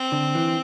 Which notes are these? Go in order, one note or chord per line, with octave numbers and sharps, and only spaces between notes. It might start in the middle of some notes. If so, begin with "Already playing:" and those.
Already playing: C4
D3
E3